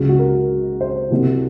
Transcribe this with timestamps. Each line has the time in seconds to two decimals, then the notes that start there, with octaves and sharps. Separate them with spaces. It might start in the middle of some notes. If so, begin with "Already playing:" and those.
Already playing: C#2 C#3 F#3
0.09 F#4
0.19 A#4
0.81 C5
1.11 C2 C3 F#3